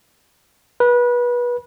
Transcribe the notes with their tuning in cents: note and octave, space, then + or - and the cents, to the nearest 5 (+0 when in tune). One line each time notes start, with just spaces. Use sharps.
B4 -25